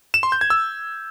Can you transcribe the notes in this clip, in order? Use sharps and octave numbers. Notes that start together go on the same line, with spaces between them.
E7
C6
G6
G#6
E6